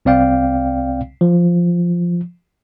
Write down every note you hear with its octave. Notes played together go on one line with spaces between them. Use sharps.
C2 C4 D5 F5 G5
F3